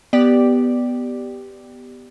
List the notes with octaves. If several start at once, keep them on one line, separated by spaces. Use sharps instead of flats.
B3 G4 D5